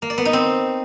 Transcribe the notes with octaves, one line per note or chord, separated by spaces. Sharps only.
A#3
D5
B3
D#4
C4